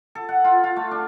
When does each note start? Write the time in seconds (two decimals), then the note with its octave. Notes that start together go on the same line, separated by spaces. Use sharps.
0.15 A4
0.29 F#5
0.44 F4
0.64 F4
0.76 A3
0.91 D4